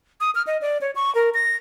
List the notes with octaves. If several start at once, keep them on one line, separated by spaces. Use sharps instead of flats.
D#6
F6
D#5
D5
C#5
C#6
A#4
A#6